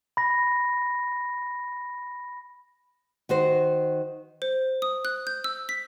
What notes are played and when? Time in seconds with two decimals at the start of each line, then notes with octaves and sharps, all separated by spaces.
0.17 B5 A#6
3.29 D#3 F#4 C5
4.42 C5
4.82 D#6
5.05 F#6
5.27 G6
5.44 E6
5.69 B6